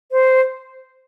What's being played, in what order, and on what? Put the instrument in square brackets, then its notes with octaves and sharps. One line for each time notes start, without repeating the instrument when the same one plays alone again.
[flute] C5